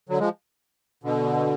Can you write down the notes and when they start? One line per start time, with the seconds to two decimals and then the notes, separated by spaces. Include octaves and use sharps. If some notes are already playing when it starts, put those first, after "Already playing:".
0.09 D3 F#3
0.19 F3 G#3
1.04 B2 D3